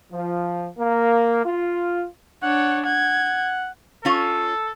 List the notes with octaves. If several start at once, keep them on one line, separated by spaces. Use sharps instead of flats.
F3
A#3
F4
D4 C#5 F#5
F#5 G#6
C#4 F4 A4 C#5